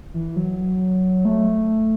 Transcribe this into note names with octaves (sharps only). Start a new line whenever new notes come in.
E3
F#3
A3